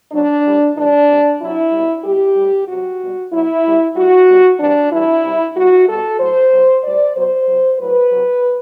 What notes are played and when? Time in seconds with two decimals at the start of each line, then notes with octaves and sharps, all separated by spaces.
0.12 B2 F#3 D4
0.44 A2 G3
0.76 A2 E3 G3 D4
1.08 C3 G3
1.40 C3 F#3 E4
1.72 B2 G3
2.04 B2 G3 G4
2.36 A2 G3
2.67 C3 F#3 F#4
3.00 B2 G3
3.32 B2 F#3 E4
3.64 B2 G3
3.95 A2 G3 F#4
4.27 B2 G3
4.59 C3 E3 G3 D4
4.91 A2 E3 G3 E4
5.23 C3 G3
5.55 B2 G3 F#4
5.87 B2 G3 A4
6.19 A2 F#3 C5
6.51 B2 F#3
6.83 A2 G3 D5
7.15 B2 F#3 C5
7.47 C3 F#3
7.79 A2 F#3 B4
8.11 C3 F#3